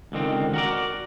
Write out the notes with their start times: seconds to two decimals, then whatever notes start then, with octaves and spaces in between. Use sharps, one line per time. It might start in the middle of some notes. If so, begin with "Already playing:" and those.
0.12 C#2 D3 D#3 C4
0.54 F#4 A#4 D5